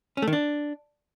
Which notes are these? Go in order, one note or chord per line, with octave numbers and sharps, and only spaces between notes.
C#4
A3
D#3
D4